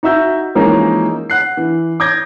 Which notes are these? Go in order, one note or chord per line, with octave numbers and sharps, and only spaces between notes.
D#4 F#4 E5 E6 G6
E3 F3 G#3 A#3 C#4 D#4
F#5 F#6 C7
E3
D6 D#6 G6 G#6 A#6